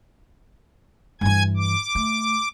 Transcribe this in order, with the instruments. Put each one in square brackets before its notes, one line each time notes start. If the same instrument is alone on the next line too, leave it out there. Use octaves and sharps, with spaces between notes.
[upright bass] G2 E3 [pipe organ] G#5 G#6
[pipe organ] D6
[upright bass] A3